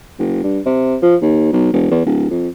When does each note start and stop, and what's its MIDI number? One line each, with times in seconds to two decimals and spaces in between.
0.19 0.42 30
0.44 0.60 43
0.66 0.97 48
1.03 1.16 53
1.22 1.49 39
1.53 1.69 35
1.73 1.87 28
1.91 2.03 40
2.06 2.28 26
2.30 2.49 41